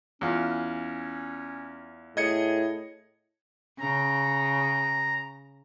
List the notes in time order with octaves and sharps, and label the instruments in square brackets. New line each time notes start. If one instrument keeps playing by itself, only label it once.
[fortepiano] E2 F4 [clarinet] C#4
[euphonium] A2 [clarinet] G#4 [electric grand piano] D#5 G#6 C#7
[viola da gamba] C#3 [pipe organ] A#5